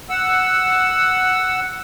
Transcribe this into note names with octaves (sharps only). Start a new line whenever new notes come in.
F#5 E6